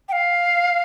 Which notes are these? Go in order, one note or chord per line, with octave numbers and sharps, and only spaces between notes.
G5
F5